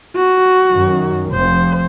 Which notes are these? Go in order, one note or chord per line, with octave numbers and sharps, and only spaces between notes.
F#4
F#2 D#3
F1 F3 C4 C5